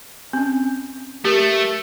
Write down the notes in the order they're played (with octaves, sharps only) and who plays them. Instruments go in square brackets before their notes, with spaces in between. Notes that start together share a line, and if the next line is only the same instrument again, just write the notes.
[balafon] C4 C#4
[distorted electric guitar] A3 [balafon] G4 A#4